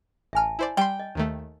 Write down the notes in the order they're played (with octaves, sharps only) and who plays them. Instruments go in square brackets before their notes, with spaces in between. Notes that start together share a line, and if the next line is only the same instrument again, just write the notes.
[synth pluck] A1 F6 [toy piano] E5 G#5 A5
[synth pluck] E4 C5 D5
[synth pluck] G3 C6 [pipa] G5
[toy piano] D#5
[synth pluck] D#2 D#3 A3